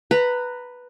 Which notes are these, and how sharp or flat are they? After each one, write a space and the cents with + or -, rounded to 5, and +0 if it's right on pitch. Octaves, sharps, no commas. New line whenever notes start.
B4 +0 A#5 -20